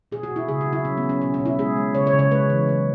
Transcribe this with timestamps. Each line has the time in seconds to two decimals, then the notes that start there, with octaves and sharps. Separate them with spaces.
0.12 B2 G#4
0.23 F#4
0.31 B2
0.36 E4
0.48 C#3 G#4
0.61 F#4
0.66 F#3
0.73 E4
0.85 F#3 C#4
0.97 B3
1.03 F#3
1.09 C#4
1.21 B2 C#4
1.34 C#4
1.39 B2
1.46 E4
1.59 G#3 G#4
1.77 G#3
1.95 C#3 C#5
2.07 C#5
2.13 C#3
2.19 C#5
2.32 G#3 B4
2.50 E3
2.69 F#3